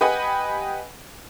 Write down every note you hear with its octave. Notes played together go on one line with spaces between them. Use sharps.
G4 B4 D#5 F#5 G#5 B5